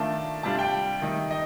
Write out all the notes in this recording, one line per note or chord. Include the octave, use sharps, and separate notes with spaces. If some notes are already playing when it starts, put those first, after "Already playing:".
Already playing: D#3 A3 D4 F4 A5
C3 G3 D4 F4 A5
G5
D#3 A3 D#4
D#5